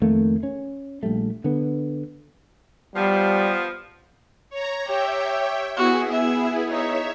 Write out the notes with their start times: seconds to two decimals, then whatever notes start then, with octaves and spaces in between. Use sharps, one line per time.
0.01 F2 D#3 A3 A#3
0.43 C#4
1.03 A#1 G3 A3
1.44 D3 B3
2.96 F3 G3 B3
4.50 C#5 A#5
4.87 G4 C#5 E5 G5
5.77 B3 E4 F#4 G#4
6.12 E5
6.68 D#4 C#5 E5